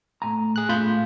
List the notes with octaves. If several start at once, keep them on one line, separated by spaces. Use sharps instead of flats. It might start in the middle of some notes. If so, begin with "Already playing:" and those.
A2 G#5 A#5
G#4 F#6
A2 F4 B5 G6